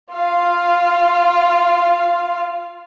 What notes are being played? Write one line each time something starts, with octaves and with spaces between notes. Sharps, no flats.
F4 F5